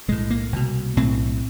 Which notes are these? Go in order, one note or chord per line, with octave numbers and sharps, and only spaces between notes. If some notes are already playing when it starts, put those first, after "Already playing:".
B1 A2 G#3
A#3
C2 B2
B1 A2 C4